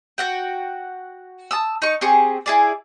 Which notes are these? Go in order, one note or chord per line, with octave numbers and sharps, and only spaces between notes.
F#4 F#5 G5
A5 D#6 E6
D#4 C#6
C4 G4 G#4 C#6
E4 G#4 D5